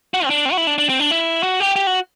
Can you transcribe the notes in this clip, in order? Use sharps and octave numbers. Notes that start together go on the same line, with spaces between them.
F#4
C4
D4
C4
F#4
E4
D4
D4
C4
D4
E4
F#4
G4
G4
F#4